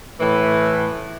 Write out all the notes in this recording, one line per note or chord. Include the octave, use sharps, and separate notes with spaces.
A2 E3